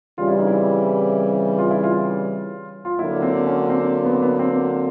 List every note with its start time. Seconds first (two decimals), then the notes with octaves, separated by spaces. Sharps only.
0.18 C#3 E3 G3 C4 F4
0.28 E4
0.38 D#4
0.47 E4
1.58 F4
1.71 E4
1.83 F4
2.85 F4
2.99 D3 F#3 A#3 E4
3.22 C4
3.46 C#4
3.69 C4
4.05 B3
4.13 C4
4.22 B3
4.39 C4